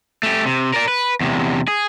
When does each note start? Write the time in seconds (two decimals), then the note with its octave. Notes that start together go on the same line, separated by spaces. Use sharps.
0.23 A3 G4
0.46 C3
0.74 A#4 D5
0.88 B4
1.21 E2 C3
1.68 G#4